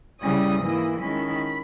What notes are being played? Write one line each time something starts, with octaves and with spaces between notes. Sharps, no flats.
C#3 G3 C#4 E4 D#6
G#2 E3 A#3 E4
D#3 G#3 C#4 E4 B5